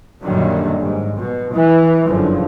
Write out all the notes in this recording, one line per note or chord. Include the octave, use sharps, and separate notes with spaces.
F#2 A#2 D3 D#3 F#3 G3
G#2
B2
E3
F#1 G2 D3 F3